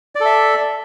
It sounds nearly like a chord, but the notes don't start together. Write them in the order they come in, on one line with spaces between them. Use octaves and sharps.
D5 A4 E5